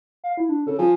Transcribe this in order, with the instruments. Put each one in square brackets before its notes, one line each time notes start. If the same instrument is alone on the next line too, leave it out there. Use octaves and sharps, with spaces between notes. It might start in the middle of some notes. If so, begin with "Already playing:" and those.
[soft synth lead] F5
E4
D4
[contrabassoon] C#3 [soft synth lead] A4
[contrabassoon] F3 [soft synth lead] G#5